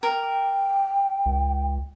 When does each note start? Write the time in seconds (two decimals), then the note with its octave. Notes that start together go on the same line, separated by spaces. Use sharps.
0.03 A#4 G5
1.26 C#2